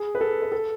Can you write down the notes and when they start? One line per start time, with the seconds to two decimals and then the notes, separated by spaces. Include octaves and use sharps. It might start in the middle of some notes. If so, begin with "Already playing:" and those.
Already playing: G#4
0.15 B4
0.21 A4
0.42 B4
0.52 A4